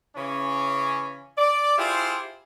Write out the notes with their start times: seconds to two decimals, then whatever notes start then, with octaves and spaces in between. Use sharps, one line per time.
0.16 C#3 E3 C#4
1.38 D5
1.78 E4 F4 G4 G#4 C5